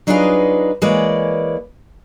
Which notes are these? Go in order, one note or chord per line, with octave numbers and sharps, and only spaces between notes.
F#3 D4 D#4 F4 G#4 B4
E3 G#3 A#3 B4 C#5 D5